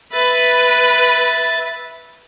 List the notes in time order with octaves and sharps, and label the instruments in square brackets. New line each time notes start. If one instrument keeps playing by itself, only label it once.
[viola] B4 [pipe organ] E5 A6